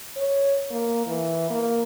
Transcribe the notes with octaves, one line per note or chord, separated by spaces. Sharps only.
C#5
A#3
E3
A#3